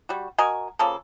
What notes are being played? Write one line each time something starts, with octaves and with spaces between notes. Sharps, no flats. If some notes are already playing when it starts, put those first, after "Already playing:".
G3 F#4
F#4 A#4 D#5 G#5
C#3 F3 A#3 A4